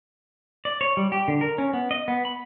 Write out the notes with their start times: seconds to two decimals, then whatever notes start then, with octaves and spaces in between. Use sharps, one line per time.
0.65 D5
0.81 C#5
0.97 G3
1.12 G4
1.28 D3
1.41 A#4
1.58 C#4
1.73 B3
1.91 D#5
2.08 B3
2.25 B5